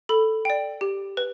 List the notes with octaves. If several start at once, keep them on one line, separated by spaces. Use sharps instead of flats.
A4 B5
D5 G5
G4
B4